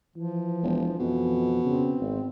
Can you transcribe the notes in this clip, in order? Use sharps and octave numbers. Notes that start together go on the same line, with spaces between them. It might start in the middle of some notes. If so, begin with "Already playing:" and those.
E3 F3
E1
F2 B2 E3
C#3 C4
G#1